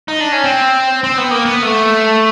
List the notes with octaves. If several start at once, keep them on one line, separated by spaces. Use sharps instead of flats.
D#4
D4
C#4
C4
C4
B3
A#3
B3
A3